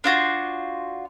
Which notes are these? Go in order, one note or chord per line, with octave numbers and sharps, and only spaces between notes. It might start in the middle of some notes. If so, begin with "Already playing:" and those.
D4 F4 F#4 C5